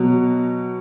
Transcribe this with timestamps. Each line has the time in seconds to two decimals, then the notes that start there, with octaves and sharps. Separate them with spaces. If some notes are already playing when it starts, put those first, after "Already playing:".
Already playing: B2 F#3